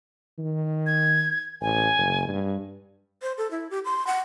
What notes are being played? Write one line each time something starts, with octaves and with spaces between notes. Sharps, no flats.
D#3
G#6
A1 G#5
F#1
G2
C5
A4
E4
G4
C6
F#5